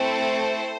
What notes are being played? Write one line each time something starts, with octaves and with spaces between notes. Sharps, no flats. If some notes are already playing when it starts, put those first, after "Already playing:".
Already playing: A3 C4 E4 A4 C5